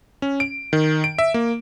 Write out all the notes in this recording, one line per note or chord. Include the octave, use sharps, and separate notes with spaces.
C#4
D7
D#3
D7
E5
A#3